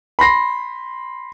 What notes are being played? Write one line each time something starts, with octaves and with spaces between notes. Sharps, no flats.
B5 C6 A#6 C7